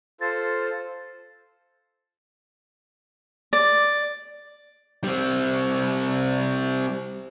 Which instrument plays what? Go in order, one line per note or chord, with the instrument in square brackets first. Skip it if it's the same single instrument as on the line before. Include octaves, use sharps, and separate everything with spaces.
[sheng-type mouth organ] F4 A4 C5 [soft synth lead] A6
[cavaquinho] D5
[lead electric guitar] G3 C4